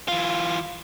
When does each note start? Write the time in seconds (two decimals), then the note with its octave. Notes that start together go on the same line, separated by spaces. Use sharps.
0.08 E3 F4